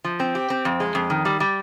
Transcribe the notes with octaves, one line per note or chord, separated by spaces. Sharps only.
F3
C4
G4
C4
F2
G#3
F2
D#3
G3
G3